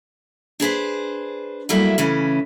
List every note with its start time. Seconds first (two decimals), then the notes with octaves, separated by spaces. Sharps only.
0.60 D4 G#4 B4 C5
1.69 F#3 G3 A3 A#3 E4
1.98 C#3 E3 A3 C#4